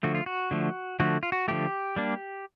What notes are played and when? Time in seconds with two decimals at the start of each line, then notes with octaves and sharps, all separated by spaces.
0.03 D3 F3 A3 F#4
0.15 F4
0.26 F#4
0.51 D3 F3 A3
1.00 D3 F3 A3 F#4
1.23 F4
1.32 F#4
1.48 D3 F3 A3 G4
1.96 G3 A#3 D4